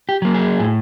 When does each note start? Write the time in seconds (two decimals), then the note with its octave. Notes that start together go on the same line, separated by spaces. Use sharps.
0.09 G4
0.22 F#3 A#3
0.34 G#4
0.60 A2